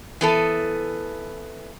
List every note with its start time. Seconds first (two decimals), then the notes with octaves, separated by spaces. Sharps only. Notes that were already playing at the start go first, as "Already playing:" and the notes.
0.21 E3 B3 A4